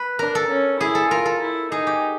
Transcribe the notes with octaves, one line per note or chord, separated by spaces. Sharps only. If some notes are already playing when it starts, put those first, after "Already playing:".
Already playing: B4
D4 A#4
A4
C#4
E4 G#4
A4
F4 A#4
A4
E4
D#4 G#4
G4